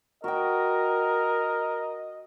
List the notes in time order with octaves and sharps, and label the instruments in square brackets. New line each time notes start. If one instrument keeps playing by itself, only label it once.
[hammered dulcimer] F#4 G5 [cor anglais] A#4 [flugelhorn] D#5